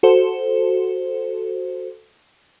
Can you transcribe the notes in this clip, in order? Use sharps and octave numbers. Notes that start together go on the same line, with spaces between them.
F#4 A4 C5